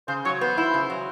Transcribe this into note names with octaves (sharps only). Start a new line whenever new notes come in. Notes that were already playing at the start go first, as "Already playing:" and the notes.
C#3 C5
F#3 C#5
B3 C5
E4
C#3
F#3